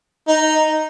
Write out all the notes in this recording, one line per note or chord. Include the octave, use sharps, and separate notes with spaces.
D#4